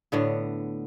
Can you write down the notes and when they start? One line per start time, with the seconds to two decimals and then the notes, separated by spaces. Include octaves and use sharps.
0.12 A2 D3 B3